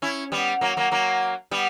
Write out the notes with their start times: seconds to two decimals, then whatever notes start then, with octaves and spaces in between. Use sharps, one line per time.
0.02 C#4 E4
0.32 G3 B3
0.61 F#3 A#3
0.77 F#3 A#3
0.91 F#3 A#3
1.51 G3 B3